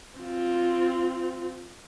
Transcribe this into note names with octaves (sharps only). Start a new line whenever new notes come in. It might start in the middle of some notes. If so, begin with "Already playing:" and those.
C4 F4